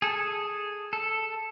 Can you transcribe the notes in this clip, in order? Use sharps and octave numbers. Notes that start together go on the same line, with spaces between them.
G#4 A4
A4